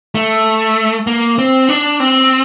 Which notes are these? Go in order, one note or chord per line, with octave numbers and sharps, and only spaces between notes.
A3
A#3
C4
D4
C4